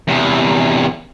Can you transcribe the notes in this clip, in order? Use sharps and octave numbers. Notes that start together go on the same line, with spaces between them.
E2 C3